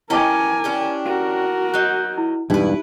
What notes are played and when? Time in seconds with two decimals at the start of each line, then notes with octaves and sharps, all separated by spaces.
0.10 C#4 E4 G4 A#4 D#5 G#5 A5 D6
0.64 C#4 D4 G4
1.05 F#4 A#4
1.74 F#3 D#4 F#6 G6
2.18 E4
2.50 E1 G2 D#4 E4 G4 B4